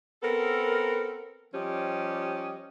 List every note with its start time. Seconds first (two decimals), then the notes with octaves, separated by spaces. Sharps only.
0.23 B3 C4 A4 A#4
1.54 F3 G3 C#4 G4 D#5